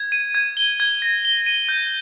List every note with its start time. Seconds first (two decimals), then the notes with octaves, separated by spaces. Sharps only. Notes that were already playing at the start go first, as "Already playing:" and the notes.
Already playing: G#6
0.12 D#7
0.35 G#6
0.57 G7
0.80 G#6
1.02 A#6
1.25 G7
1.46 D#7
1.69 G6